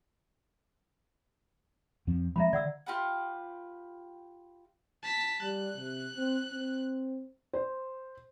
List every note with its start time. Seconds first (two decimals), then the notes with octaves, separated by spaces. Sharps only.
2.07 F2 F3 C4
2.36 F3 G#3 C4 E5 A#5 B5
2.53 D3 D5 F#5 E6
2.86 F4 G4 B4 F#5
5.03 A5 B6
5.42 G3 F#6
5.77 C3
6.17 C4
6.52 C4
7.53 C5